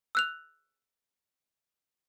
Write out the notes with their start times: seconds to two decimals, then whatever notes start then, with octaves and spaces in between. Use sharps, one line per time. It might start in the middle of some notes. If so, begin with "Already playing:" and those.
0.15 E6 F#6 F7